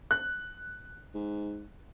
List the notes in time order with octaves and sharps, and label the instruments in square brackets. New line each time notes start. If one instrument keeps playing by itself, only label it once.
[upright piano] F#6
[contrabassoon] G#2